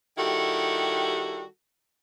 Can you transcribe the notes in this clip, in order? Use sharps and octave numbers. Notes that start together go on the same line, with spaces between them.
D#3 G3 E4 F#4 G4 A4